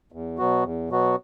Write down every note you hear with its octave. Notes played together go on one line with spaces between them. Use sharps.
E2
B2 F#3 B3 F#4
E2
B2 F#3 B3 F#4